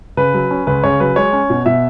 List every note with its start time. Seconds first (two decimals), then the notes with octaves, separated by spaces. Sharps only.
0.17 C#3 B4
0.34 F#3
0.51 C#4
0.67 C#2 B4
0.84 C#3 C#5
1.00 F#3 B4
1.16 G#3 C#5
1.33 C#4
1.50 B2
1.66 B2 E5